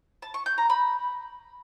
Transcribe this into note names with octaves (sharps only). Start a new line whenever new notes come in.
A5
C#6
G6
A#5
B5